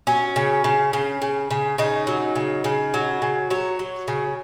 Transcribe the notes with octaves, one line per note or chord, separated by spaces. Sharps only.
F#3 C#4
C#3
C#3
C#3
C#3
C#3
C#3 D#4
F#3
C#3
C#3
F#3
C#3
F#3 C#5
F#3
C#3